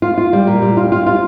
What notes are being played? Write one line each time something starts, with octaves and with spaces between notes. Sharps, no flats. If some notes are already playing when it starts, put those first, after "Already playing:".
F4
F4
G3
A#2
G3
F4
F4
F4